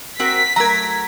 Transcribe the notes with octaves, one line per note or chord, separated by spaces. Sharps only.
C4 F#4 A#4 B6
F#3 A3 A#4 A#5 G#6